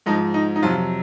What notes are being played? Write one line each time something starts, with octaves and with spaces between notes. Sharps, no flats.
G#2 F3 D#4
D#4
D#4
F2 C3 F#3 F4